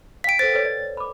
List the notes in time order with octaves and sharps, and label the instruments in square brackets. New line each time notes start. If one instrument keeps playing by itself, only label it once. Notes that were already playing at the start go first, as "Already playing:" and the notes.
[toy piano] F5 G5 [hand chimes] B6 D7
[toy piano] A4 B4 C5 [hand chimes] A6
[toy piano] A4 B4 C#5
D5
B5 D6